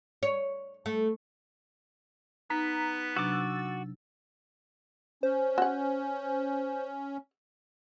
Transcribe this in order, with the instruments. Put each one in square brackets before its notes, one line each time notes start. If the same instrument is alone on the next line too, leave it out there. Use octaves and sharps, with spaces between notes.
[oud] C#5
A3
[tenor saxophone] B3 [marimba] D#4 [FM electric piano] A#5 B6
[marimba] C3 F#3 D4 [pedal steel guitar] F#4 D6 [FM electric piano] E6 A6
[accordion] C#4 [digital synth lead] C5
[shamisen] F#4 F#5